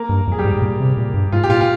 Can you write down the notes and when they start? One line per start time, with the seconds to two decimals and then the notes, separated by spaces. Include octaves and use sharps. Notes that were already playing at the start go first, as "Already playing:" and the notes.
Already playing: A#3 A#4
0.09 G2
0.27 F2 G#4
0.39 G3 G4
0.45 G#2
0.56 G#2
0.62 A#2
0.80 C3
0.97 A#2
1.14 G2
1.32 G#2 F4
1.43 G4
1.49 A#2 F4
1.61 F4